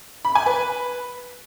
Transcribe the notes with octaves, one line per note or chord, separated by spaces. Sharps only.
B5
G#5
B4